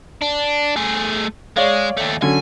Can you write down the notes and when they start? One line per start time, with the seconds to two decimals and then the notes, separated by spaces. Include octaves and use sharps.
0.21 D4
0.76 A3 G#4
1.57 G#3 C#5 D5 F5
1.97 D#2 A3
2.22 D3 F#3 C#4 G#5